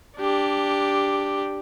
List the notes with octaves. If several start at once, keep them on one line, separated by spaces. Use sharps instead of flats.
D4 G4